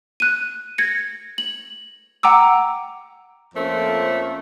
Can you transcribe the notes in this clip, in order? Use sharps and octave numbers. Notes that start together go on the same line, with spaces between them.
F#6 D#7
G#6 A#6 C#7
F#7
F#5 G5 A#5 D6 E6
F2 F3 A3 A#3 C#4 C5